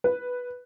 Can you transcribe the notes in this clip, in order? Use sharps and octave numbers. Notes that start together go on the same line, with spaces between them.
B4